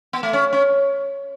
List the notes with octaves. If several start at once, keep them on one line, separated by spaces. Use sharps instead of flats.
B3
A3
C#4
C#4